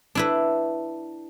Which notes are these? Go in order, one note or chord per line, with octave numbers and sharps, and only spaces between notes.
D4 E4 B4